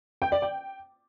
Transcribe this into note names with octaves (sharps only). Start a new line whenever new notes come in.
G5
D5
G5